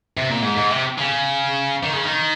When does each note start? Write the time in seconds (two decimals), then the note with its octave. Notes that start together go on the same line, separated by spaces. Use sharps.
0.17 C3
0.30 A#2
0.42 G#2
0.56 G#2
0.70 C3
0.99 C#3
1.83 D#3
1.93 C#3
2.03 D#3